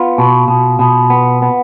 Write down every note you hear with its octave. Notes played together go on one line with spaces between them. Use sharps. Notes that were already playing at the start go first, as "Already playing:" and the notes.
Already playing: B3 F4
B2
B2
B2
B3
B3